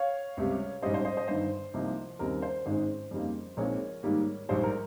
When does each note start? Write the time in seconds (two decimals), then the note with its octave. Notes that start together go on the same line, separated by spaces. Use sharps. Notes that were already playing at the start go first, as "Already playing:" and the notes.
Already playing: C#5 F5
0.37 C#2 C3 G3
0.82 A#1 G#2 G3 C#4 C5 D#5
0.94 C5
1.05 C5 D#5
1.17 C5 D#5
1.28 G1 G2 D#3 C5
1.74 C2 C3 F3 A#3 D#4
2.19 D#2 C#3 G3 C4 D#4 A#4
2.42 C5
2.66 G#1 G#2 D#3 G#3 C#4 C5
3.11 F2 C#3 G3 A#3 D#4
3.57 A#1 A#2 G#3 C4 D#4 A#4 C#5
4.03 G#2 D#3 G3 A#3
4.49 A#1 G#2 G3 C5
4.63 A#4